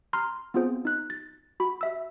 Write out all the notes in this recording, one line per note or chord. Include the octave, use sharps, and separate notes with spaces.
A#5 C6 F6
B3 C4 F4 G#4 C5
D#4 F#6
A6
F#4 B5
E5 E6